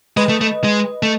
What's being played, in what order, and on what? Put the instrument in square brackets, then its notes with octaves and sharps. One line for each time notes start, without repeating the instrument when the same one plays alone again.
[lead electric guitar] G#3 [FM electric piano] B4 D#5
[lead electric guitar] A3
A3
G#3
A3